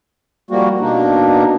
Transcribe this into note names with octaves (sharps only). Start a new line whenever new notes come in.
F3 G3 A#3 F#4
B2 A#3 D4 D#4